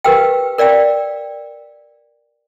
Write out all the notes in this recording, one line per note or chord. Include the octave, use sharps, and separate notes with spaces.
G4 A#4 B4 F5 G5
A#4 D5 F5 G5